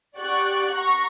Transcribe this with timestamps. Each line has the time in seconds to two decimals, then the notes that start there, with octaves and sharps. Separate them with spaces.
0.17 G4 D5 F#5 C#6 F#6
0.72 F#5 A#5 C#6